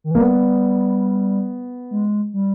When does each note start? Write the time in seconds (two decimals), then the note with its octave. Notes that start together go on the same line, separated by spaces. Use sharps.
0.04 D#3
0.11 E3
0.15 A#3
0.19 G3 B3
1.91 G#3
2.34 G3